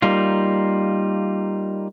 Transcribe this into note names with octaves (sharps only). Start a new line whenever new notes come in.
G3 A#3 D#4 F4